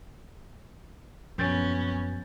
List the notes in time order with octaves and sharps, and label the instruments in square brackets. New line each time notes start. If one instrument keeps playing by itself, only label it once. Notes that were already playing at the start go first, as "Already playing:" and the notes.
[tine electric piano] A#1 G6 A6 [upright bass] F#2 [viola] B3 C#4